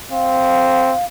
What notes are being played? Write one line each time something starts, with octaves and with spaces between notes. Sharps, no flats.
C4 F5